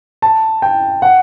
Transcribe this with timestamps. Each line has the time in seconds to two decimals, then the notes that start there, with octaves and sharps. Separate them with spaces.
0.22 A5
0.62 G5
1.02 F#5